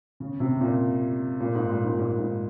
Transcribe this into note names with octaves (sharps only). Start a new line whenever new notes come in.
C#3
C3
A#2
A#2
G#2
A#2
G#2
A#2
G#2
G#2